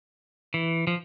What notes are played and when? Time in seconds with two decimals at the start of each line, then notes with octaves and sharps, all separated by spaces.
0.54 E3
0.87 F3